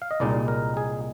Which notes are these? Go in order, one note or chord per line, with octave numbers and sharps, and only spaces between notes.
F5
D#5
C2 A#2 G#3 D#4 D5
A#4
G#4